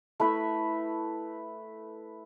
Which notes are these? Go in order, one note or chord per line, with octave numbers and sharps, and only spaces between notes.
A3 E4 B4 E5